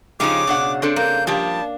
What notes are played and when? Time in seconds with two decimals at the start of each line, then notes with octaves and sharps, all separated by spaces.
0.20 C#3 F3 D#4 G4 C#5 F5 D6
0.47 B2 D4 F#5
0.82 C4 D4 A4 C5
0.96 A#3 G6
1.27 F3 G3 D4 G4 A5